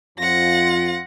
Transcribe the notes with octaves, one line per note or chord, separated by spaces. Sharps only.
F2 F3 F4 F#5 A#6